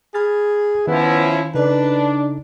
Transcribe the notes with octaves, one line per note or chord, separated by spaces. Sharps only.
G#4 B5 F6 A6
D#3 F3 B3 C#4 E4
C#3 D4 D#4 A4 B4